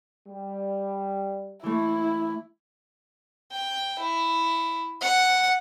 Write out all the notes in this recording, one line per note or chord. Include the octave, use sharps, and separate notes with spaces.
G3
E3 A3 E4
G5
E4
F#5